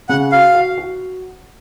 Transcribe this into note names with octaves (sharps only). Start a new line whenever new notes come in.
C#3 F#5
F#4 F5
F#4
F#4